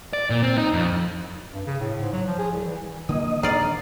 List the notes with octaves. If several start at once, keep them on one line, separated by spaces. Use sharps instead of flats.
D5
A#2
C4
D#4
F2
G2
C#3
A2
G#2
F#3
F3
G#4
C2
E3
D3 A#3 D#5
D#1 D4 D#4 D5 F5